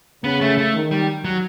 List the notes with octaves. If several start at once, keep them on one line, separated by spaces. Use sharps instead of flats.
C#3 B3
A3
A3
D#3
G3
F#3